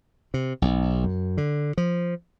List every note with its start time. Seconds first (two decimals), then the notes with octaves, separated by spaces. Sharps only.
0.34 C3
0.62 B1
1.04 F#2
1.37 D3
1.77 F3